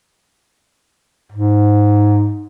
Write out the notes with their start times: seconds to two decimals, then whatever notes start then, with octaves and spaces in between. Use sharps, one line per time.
1.32 G#2